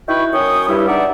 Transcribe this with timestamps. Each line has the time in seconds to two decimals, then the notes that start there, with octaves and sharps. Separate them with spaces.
0.08 D#4 E4 F#4 B4 G5 C#6
0.33 F#2 C#4 C#5 G5 C#6 D#6
0.68 G2 G3 E4
0.88 E2 D4 D#4 D5 E5 F#5